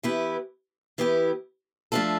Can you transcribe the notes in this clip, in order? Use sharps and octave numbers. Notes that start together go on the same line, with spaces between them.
E3 B3 E4 G4 B4
E3 B3 E4 G4 B4
F3 A3 D4 F4 A4